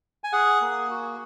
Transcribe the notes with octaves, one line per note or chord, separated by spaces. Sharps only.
G#5
G#4 F#5
A#3
F#4